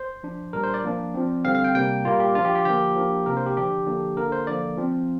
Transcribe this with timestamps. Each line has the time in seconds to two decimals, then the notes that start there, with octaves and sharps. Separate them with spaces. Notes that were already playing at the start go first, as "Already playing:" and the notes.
Already playing: C5
0.23 F3 D4
0.53 A#2 G3 D4 A#4
0.63 C5
0.74 D5
0.84 F3 A#3 D4
1.14 F3 C4
1.44 D3 G3 C4 F5
1.55 F5
1.64 G5
1.75 C3 G3 A#3 G5
2.05 A#2 G3 A#3 F4
2.20 G4
2.35 F3 D4 F4
2.45 G4
2.55 G4
2.65 D3 F3 A#3 G4
2.96 F3 A#3 D4
3.26 C3 A#3 D4 A#4
3.37 C5
3.46 G4
3.57 D3 F3 D4 G4
3.87 D3 F3 A#3 D4
4.16 D3 A#3 D4 A#4
4.32 C5
4.47 D3 F3 A#3 D5
4.78 F3 C4